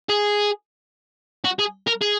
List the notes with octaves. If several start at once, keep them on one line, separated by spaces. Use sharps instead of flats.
G#4
F#4
G#4
A#4
G#4